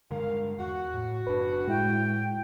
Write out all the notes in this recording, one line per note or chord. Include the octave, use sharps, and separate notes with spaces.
G2 D3 G#3 A#4 F5
E2 F#4
A2
F#1 D4 B4
A2 G#3 E4 G5